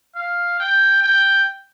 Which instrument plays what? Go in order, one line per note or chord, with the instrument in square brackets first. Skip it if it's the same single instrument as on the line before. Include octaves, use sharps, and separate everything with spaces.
[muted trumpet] F5
G5
G5